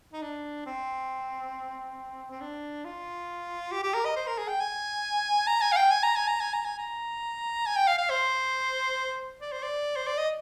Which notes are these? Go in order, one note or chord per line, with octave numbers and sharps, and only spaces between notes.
D#4
D4
C4
C4
D4
F4
G4
G4
A#4
D#5
C5
A#4
G#4
G5
G#5
A#5
G#5
F5
G5
G#5
A#5
G#5
A#5
G#5
A#5
G#5
A#5
G#5
G5
F5
F5
C5
D5
C5
D5
C5
D5
D#5